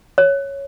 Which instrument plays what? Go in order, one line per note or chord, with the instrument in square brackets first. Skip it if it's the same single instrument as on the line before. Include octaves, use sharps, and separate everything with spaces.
[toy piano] C#5